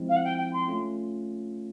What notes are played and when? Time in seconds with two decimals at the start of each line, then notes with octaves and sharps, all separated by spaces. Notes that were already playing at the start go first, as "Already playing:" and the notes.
Already playing: F3 G#3 C4 E4
0.09 F5
0.16 F#5
0.24 G5
0.38 G5
0.53 C6
0.68 A3 C#4 F4